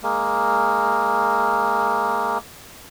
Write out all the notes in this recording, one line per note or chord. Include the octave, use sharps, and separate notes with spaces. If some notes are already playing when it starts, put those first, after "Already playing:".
G#3 A#3